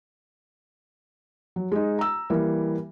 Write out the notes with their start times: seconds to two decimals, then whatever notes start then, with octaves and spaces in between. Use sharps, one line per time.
1.56 F#3
1.72 G#3 D#4
1.99 A#5 E6
2.30 E3 G3 A#3